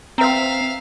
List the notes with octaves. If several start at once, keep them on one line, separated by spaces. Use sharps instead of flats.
C4 B4 E5 F5 A#5